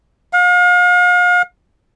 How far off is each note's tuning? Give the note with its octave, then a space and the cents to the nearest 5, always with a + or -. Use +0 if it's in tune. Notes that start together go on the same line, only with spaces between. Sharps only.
F5 +40